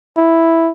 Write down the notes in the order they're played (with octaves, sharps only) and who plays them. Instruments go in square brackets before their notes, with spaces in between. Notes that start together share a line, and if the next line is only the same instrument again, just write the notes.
[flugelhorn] E4